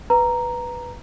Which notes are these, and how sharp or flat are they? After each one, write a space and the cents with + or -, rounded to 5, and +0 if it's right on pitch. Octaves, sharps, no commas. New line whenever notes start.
B4 +0 A#5 +0